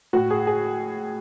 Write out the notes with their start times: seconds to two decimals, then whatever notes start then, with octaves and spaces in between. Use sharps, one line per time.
0.13 A2 F#4
0.30 G#4
0.47 G#4